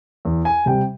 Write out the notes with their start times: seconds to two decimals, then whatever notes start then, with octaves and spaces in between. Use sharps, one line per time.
0.25 E2
0.45 G#5
0.66 C3 G3 G5